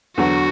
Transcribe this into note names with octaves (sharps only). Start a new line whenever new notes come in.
E2 D3 F#3 F#4